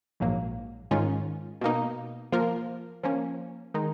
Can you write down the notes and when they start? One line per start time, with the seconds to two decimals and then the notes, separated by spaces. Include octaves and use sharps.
0.20 A#1 G#2 F#3 A#3
0.91 G#2 D#3 G#3 C#4 F4
1.61 B2 A#3 D#4
2.32 F3 A#3 F4 A#4
3.03 F3 A#3 C#4
3.74 D#3 G#3 D#4